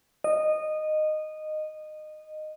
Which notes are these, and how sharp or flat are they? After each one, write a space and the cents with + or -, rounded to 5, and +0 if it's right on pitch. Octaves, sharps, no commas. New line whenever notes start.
D#5 -15